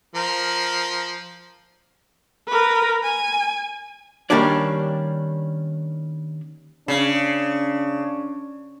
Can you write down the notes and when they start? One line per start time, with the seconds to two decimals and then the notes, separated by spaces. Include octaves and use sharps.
0.15 F3 A#4
2.47 A#4 B4
3.04 G#5
4.30 D#3 G3 A#3 C#4 D4 D5
6.88 C#3 D4